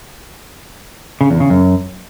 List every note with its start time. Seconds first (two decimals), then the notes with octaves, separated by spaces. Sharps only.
1.21 C#3
1.30 E2
1.40 C#3
1.50 F#2